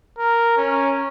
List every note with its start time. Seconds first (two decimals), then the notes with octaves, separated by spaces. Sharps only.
0.18 A#4
0.57 C#4